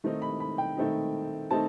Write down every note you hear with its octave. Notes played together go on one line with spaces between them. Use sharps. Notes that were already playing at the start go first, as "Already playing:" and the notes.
D#3 A3 C4 D#4
B5
B5
G5
D#3 A3 C4 D#4
D#3 A3 C4 D#4 A5